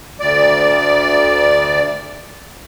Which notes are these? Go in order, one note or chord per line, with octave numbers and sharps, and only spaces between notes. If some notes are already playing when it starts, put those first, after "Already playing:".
D2 D5